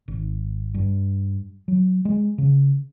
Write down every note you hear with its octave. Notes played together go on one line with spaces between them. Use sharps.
G#1
G2
F#3
G#3
C#3